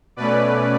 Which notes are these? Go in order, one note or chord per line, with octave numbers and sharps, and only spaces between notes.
B2 A3 C#4 B4 D5